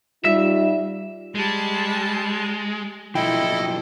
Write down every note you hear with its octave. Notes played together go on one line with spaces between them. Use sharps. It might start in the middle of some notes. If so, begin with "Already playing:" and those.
G3 D#4 F4 E5
G3 G#3 A5
B1 F3 E4 A4 D#5 G5